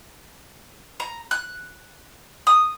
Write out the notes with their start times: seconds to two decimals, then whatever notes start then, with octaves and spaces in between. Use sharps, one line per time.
1.00 A#5
1.31 F#6
2.47 D#6